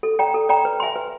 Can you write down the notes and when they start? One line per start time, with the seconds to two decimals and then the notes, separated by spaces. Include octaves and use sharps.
0.03 A4
0.19 D5 G5 A#5
0.34 A4
0.49 D5 G5 A#5
0.65 B4
0.80 E5 G#5 C6
0.96 B4